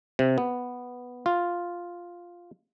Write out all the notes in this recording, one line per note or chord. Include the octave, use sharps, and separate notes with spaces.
C3
B3
F4